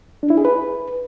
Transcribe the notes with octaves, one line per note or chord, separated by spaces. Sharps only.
D4
E4
G#4
B4